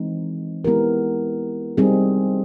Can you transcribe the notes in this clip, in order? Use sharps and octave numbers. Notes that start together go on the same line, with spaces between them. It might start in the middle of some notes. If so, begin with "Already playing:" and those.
Already playing: E3 G#3 C4 D#4
G#3 B3 E4 G4 A#4
G3 C4 D#4 G#4